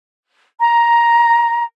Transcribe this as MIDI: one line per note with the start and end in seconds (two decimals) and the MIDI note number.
0.60 1.64 82